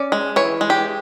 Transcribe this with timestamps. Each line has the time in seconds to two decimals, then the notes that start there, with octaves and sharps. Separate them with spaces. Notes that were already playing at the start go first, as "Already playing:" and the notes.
Already playing: C#4 D5
0.12 G#3
0.36 E3 C#5
0.61 G#3
0.70 G4